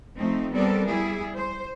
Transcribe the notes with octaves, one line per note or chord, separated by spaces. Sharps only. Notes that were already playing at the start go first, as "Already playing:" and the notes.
F3 A3 C4 D#4
G3 B3 C4 A4 A#4 D5
G3 E4 G#4
C5